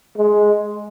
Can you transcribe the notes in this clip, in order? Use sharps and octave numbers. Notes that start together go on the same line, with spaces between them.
G#3